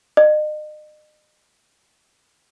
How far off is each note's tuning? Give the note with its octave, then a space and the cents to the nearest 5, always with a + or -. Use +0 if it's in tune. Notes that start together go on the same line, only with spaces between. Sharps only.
D#5 -40